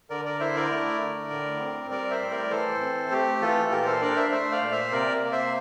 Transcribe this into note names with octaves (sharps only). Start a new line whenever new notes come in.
D3 A#4 D5
A#4 D5
E4 C5 E5
A#4 D5
A3
D3
A2
C4
G3 A#4 D5
C5 E5
A2
A#4 D5
E3 A4 C5
C4
A3 G4
E3 F4 A4
A#2 G4 A#4
A4 C5
D4 A#4 D5
C5 E5
A3 C5 E5
D5 F5
A#2
C5 E5
C3 A#4 D5
A#3
C5 E5